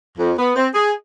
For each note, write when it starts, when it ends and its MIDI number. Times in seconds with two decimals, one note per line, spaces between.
0.19 0.33 41
0.38 0.52 59
0.56 0.68 60
0.74 0.92 68